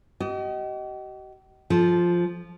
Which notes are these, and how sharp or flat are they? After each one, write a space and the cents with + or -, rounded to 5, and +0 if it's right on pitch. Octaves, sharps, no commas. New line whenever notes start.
G4 -45 D#5 +0
F3 +0 A4 -25